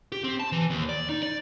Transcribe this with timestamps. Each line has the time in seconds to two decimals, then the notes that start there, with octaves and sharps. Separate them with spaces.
0.12 G4
0.24 C4
0.40 A5
0.52 E3
0.70 D#2
0.89 D5
1.09 D#4
1.23 D5